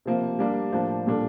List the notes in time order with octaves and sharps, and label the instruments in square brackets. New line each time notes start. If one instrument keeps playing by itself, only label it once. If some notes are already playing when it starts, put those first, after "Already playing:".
[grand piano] C3 F3 A#3
G3 A#3 D4
A2 F3 A#3 D4
A#2 G3 D4 A4